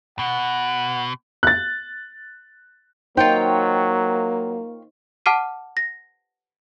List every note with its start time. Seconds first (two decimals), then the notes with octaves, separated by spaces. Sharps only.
0.19 B2 F#5
1.43 F#6 A6
3.17 F#3 A#3 D#4 F4 C5 C#5 G5
5.26 F#5 A5 D6 F6 C7 D#7
5.77 A#6